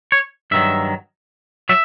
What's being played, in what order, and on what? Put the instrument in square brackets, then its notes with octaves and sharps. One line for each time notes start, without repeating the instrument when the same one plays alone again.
[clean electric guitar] C#5
G2 D#3 F#3 E5
F#3 E5